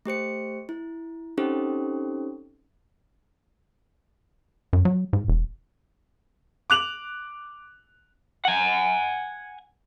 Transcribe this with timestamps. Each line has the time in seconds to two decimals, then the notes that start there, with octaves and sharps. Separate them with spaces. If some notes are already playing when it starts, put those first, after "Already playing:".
0.05 A3 G4 C5 C#7
0.69 E4
1.38 C4 C#4 D#4 G4 A4 C5
4.73 F#2
4.85 F#3
5.13 G#2
5.28 E1
6.70 D6 F#6 F7 F#7
8.45 F#5 G#5